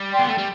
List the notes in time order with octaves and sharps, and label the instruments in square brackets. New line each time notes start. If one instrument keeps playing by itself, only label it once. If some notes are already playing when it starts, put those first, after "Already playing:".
Already playing: [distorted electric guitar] G3
[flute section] D5 G5 C6
[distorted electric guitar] B3
A3
G3